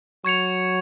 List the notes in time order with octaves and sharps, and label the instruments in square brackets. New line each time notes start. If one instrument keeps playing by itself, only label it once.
[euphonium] F#3 [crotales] C#6 G#6 C#7 F7